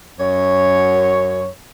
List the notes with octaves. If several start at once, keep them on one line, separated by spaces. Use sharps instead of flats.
F#2 C#5